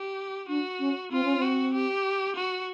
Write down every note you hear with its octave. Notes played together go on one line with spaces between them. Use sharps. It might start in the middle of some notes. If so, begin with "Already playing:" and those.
Already playing: G4
D4 F#4
C#4
C4 F4
C#4
C4
F#4
G4
F#4